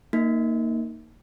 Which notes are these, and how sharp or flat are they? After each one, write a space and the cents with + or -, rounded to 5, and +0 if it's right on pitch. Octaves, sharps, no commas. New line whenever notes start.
A#3 -15 D#4 +0